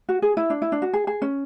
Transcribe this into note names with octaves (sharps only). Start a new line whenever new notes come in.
F#4
G#4
E4
D4
E4
D4
F#4
G#4
G#4
C#4